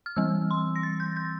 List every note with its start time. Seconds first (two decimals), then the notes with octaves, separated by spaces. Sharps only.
0.06 F6
0.16 E3 G3 C4 E6
0.51 C6
0.76 A#6
0.83 A6
1.00 G6
1.17 G6